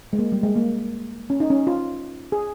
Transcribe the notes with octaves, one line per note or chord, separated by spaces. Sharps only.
G#3
A#3
G3
G#3
A#3
C#4
D#4
C#4
F4
G#4